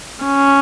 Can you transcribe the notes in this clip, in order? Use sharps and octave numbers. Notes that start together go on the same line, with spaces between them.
C#4